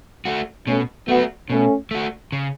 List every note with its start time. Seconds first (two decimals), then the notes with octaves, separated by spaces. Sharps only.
0.25 A3 F#4
0.67 B2 A3 C#4
1.08 F#3 A3 B3 F#4
1.50 B2 A3 C#4
1.91 A3 F#4
2.32 C#3